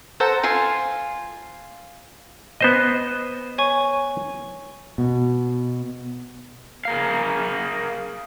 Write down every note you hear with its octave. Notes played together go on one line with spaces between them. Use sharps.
A4 C5 F#5 A#5
F4 G#5 C6
B3 C5 D#5
C#5 G#5 C#6
B2
G#4 A#4 F5